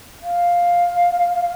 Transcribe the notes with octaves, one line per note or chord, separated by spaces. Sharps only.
F5